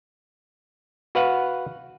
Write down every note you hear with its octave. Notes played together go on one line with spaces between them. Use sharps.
F#4 B4 F5 F#5